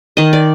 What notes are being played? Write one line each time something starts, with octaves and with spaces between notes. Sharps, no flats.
D#3 D#5
D5